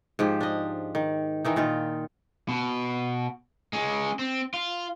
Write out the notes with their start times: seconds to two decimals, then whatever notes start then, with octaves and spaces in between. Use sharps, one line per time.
0.19 G#2 F3 G4
0.41 D4 D#5
0.95 D#3
1.45 D#3 E3 D#4
1.56 A#2 D#3 F4
2.49 B2
3.73 G#3 C#4
4.19 C4
4.54 F4